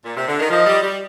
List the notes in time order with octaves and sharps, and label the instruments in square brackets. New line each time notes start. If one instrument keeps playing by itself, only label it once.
[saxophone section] A#2
C3
D3
D#3
[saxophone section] F3 [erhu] D#5
[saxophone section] G3
G3